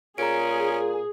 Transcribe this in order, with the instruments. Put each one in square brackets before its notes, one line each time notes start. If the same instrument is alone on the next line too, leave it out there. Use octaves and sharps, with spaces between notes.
[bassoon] A#2 [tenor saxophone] C#4 [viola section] G#4 [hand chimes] A#5 D7